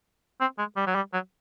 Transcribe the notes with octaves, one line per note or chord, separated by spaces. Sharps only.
C4
G#3
G3
F#3
G3
F#3